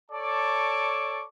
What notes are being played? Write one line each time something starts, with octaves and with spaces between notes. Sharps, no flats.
A4 C#5 D5 A5 C#6 D6